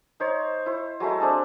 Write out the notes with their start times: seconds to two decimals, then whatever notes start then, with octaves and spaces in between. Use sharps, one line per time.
0.20 D#4 C5 C#5
0.66 E4 C5
1.00 F#3 G#3 A3 E4
1.20 C4 D4 G#4 A5